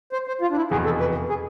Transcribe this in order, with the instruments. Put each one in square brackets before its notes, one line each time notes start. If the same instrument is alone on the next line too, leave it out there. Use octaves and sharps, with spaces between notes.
[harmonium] C5
C5
F4
D4
E4
[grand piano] F1 E2 B2 [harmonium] G#4
[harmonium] A4
B4
G#4